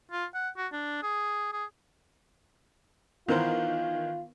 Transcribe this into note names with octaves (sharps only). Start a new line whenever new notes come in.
F4
F#5
F#4
D4
G#4
G#4
D#3 E3 B3 F4 A#4 C5